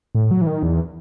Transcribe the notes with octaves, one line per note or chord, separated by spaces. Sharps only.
A2
F#3
E3
D#3
E2